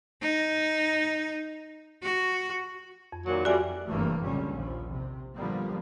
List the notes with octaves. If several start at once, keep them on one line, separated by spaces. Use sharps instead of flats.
D#4
F#4
F2
D#2 A#2 F#3
F2 G3 F#4 E5 G#5
F1 G2 C3 E3 A3 A#3
F1 C#2 A#2 D3 G3 C#4
A#1 D#2 F3
C3
A#2 D3 F3 G3 A#3 B3